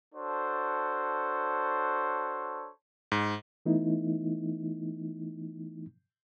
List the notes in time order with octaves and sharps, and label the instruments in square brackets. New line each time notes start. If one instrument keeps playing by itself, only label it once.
[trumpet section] D4 F#4 A4 C5 C#5
[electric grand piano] G#2
[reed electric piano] E3 A3 B3 D#4 E4